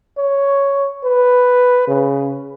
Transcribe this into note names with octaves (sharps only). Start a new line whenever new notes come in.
C#5
B4
C#3